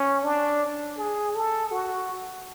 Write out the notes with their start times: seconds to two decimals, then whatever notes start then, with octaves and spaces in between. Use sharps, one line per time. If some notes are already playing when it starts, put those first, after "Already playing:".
Already playing: C#4
0.24 D4
0.98 G#4
1.35 A4
1.71 F#4